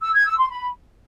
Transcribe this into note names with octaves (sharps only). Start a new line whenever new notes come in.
E6
G#6
E6
C6
B5